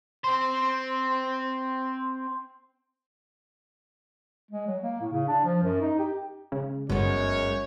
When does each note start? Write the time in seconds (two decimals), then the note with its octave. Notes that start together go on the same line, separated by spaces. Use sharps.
0.24 C4 C5
4.51 G#3
4.67 F#3
4.83 A#3
5.01 A2
5.12 C#3
5.28 D4
5.45 F3
5.63 F#2
5.81 D#4
5.99 G4
6.52 C#3 G#3
6.90 G1 F#2 G#3 B3 C#5